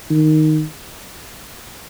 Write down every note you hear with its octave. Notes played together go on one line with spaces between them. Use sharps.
D#3